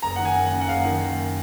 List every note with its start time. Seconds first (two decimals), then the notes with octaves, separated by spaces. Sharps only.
0.02 F#1 A#5
0.16 D#3 F#5
0.25 G#5
0.36 F#1
0.46 F#5
0.53 F#2
0.61 F#5
0.68 F#1 F5
0.85 D#3
1.02 F#1